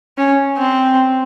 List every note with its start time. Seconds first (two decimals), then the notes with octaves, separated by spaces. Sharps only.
0.18 C#4
0.59 C4